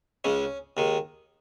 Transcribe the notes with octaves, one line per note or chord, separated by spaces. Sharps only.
C#2 C#3 G#3 C#4
D#2 D#3 G#3